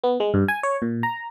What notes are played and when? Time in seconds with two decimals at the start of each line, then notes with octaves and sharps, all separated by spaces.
0.04 B3
0.20 G#3
0.34 G2
0.48 G#5
0.63 C#5
0.82 A#2
1.03 A#5